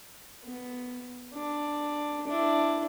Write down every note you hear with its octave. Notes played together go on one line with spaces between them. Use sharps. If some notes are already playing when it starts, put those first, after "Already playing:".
B3
D4
D4 E4